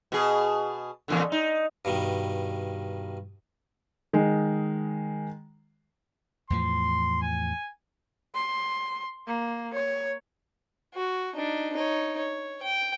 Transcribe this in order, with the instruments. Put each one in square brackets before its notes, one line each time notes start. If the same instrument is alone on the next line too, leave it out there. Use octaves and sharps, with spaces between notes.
[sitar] B2 G#4
E2 A#2 D3
D#4
[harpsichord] G2 B2 D#3
[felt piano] D#3 G#3
[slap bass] E2 A2 F3 [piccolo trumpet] C6
[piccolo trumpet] G#5
[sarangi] C6
A#3
C#5
[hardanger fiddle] F#4
D4 D#4
D#4 C#5
C#5
G5